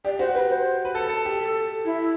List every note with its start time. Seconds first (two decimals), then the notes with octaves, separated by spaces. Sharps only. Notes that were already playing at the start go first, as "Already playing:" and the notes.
0.05 G4 D5
0.19 F#4 C5
0.35 G4 B4
0.50 C5
0.85 B4
0.95 A4
1.10 A4
1.25 G4
1.40 A4
1.85 E4